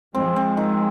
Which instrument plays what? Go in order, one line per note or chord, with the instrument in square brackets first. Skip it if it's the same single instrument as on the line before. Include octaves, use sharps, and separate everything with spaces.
[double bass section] F3 G#3 [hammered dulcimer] C4
[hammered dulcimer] C4
D#3